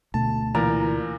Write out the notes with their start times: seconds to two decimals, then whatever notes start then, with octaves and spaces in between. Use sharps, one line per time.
0.14 D2 B2 A3 A5
0.55 A#2 E3 A#4 D5 A#5